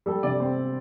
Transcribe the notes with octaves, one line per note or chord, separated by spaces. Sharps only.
G3 A4
C3 D5
C4